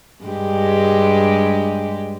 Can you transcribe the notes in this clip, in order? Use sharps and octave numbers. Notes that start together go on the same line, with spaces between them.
G2 G#3 G4